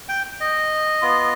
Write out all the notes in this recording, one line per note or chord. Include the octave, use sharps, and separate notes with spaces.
G5
D#5
B3 F4